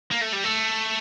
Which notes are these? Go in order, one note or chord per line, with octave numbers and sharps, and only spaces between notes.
A#3
A3
G3
A3